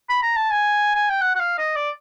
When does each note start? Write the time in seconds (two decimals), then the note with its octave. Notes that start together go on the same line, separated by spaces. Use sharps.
0.09 B5
0.23 A#5
0.36 A5
0.51 G#5
0.95 G#5
1.09 G5
1.22 F#5
1.35 F#5
1.39 F5
1.58 D#5
1.76 D5